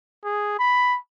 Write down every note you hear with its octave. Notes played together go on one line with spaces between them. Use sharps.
G#4
B5